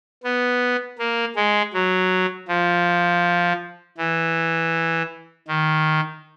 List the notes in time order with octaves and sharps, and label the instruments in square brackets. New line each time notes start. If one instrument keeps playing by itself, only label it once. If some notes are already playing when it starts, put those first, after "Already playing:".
[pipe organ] B3
A#3
G#3
F#3
F3
E3
D#3